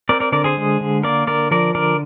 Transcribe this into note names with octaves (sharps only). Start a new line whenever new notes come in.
C4 A#4 D5
A#4 D5
D3 A#4 D5
G#4 C5
G#3
D3
A#3 A#4 D5
D3 A#4 D5
F3 A#4 D5
D3 A#4 D5